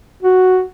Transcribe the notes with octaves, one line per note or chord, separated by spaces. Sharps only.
F#4